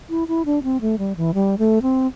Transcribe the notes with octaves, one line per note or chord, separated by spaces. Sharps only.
E4
E4
D4
C4
A3
G3
E3
G3
A3
C4